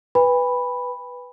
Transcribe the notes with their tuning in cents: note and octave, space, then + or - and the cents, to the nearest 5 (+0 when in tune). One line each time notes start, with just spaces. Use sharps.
B4 +0 G#5 -45 B5 +0